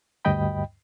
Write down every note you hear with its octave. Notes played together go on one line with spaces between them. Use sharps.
D2 G2 D#5 G5 B5